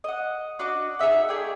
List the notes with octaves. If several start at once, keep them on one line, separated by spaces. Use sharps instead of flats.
D#5 F#5
D4 F#4 D#5 D6
D#4 G#4 E5 F#5
A3 G#4 D5 G5